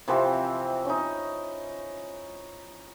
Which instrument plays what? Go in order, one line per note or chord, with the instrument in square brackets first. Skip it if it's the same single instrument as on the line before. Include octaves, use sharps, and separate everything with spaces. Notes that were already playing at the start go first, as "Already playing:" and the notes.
[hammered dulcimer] C3 E3 F3 C4
C#4 D#4